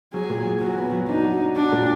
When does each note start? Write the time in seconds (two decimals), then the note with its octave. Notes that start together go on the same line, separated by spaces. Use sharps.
0.13 F#3 G#4
0.30 A#2
0.46 F#3
0.61 F#3 F#4
0.77 B3
0.92 F#3
1.09 D4 D#4
1.24 F#4
1.40 D4
1.55 D4 F#4
1.72 A#2